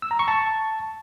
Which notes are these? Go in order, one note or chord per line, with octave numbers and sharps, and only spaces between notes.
E6
A#5
C#6
A5